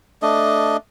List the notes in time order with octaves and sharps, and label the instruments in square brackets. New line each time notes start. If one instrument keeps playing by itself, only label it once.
[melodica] A3 D4 D#5